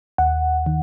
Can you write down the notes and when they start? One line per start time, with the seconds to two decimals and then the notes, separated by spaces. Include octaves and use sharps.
0.18 D#2 F#5
0.66 D#3